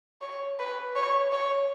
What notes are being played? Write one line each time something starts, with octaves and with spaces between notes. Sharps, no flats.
C#5
B4
C#5
C#5